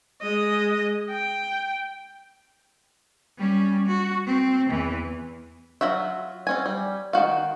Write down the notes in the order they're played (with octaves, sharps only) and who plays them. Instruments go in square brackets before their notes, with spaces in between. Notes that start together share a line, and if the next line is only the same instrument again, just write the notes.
[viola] G#3 D#5
G5
[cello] G3 C#4
F#4
C4
E2 E3
[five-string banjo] F#3 F4 F#4 E5
C4 C#4 G#5
G3
D#3 F3 F#4 F5